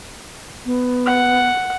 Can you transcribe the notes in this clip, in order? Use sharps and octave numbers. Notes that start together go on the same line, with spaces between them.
B3
F#5